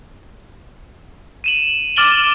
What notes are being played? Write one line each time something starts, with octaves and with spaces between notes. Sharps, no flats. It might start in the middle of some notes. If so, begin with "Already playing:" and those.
D#7 E7 F#7
D6 F6 A6 D7 F#7 G7